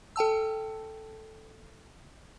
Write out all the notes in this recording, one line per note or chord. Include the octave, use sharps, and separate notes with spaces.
A4 G5 A5 E6